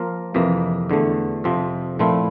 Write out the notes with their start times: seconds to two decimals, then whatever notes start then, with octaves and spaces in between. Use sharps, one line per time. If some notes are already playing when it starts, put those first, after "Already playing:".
Already playing: F3 A#3 F4 A#4
0.34 F2 C3 E3 A#3
0.89 E2 D3 A3
1.44 F2 C3 F3 C4
1.99 A#2 F3 A3 C4 E4